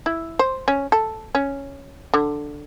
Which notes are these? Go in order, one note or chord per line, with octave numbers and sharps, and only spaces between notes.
E4
C5
C#4
A4
C#4
D3